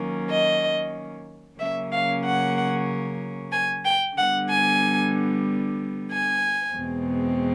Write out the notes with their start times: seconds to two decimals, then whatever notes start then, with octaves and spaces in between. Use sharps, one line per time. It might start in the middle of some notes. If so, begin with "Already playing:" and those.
Already playing: D#3 F#3 A#3 C#4
0.30 D#5
1.59 C#3 F#3 A#3 C#4 E5
1.91 F5
2.24 F#5
3.52 G#5
3.84 G5
4.17 D3 G3 B3 F#5
4.49 G#5
6.10 G#5
6.76 E2 B2 G#3 C4